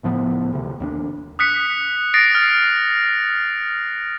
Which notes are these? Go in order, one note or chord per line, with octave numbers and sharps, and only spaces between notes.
C#2 A2 F3 B3
D2 C3
D#2 A#3 D4
D#6 F#6 B6 C#7
D#6 A6 A#6 C7 D7
F6 A6